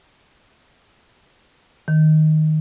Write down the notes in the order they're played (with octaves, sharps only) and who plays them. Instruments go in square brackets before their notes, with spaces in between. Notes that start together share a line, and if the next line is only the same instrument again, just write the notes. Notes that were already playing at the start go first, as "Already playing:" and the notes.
[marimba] D#3